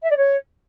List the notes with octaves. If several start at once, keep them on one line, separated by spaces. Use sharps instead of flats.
E5
D5
C#5